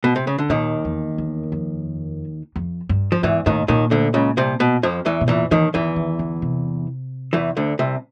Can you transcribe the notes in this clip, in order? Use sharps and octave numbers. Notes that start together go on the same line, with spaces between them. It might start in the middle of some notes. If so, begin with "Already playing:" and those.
B2
C3
C#3
D3
D#2 A#2 D#3
E2
E2
F2
F2
G2
F3
E2 G#2 E3
D#2 A2 D#3
D#2 A#2 D#3
D2 D3
C#2 C#3
C2 C3
B2
F2 F3
E2 E3
B2
E2 A#2 E3
D#2 D#3 E3
E2 D#3 E3
D#3
D3
C3
E2 E3
D2 D3
C2 C3